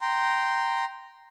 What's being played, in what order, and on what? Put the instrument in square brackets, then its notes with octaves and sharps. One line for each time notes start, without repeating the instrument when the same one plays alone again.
[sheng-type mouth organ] G5 A#5 C6